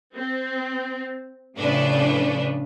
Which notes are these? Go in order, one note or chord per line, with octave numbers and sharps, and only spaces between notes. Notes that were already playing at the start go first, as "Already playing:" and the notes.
C4
A2 C#3 F3 D4 B4